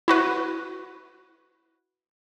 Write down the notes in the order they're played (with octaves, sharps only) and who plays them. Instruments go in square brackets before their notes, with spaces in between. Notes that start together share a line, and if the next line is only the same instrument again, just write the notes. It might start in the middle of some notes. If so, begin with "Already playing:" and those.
[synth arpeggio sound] E4 F#4 B4